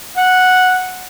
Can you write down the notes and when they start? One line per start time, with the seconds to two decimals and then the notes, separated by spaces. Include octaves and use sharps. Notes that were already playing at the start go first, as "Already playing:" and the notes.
0.17 F#5